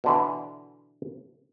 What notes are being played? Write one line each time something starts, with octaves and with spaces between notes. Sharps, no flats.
B2 D3 E3